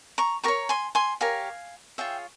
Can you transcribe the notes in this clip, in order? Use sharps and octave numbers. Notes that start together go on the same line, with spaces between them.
A#5 C#6
G4 A#4 C#5 A#5 C#6
G#5 C6
G#5 C6
G4 A#4 C#5 F5 G#5
F4 G#4 C#5 E5 G5